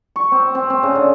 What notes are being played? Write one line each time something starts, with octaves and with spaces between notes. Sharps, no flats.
C#6
C4
C4
C4
C#3
D3